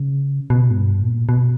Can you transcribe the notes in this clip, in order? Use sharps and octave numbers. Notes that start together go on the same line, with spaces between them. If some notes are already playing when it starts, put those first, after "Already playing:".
Already playing: C#3
B2
G#2
G2
A#2
B2